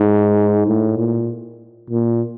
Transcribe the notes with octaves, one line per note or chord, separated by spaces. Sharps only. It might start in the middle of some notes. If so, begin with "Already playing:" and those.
Already playing: G#2
A2
A#2
A#2